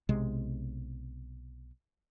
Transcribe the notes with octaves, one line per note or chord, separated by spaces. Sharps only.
B1 C3 G#3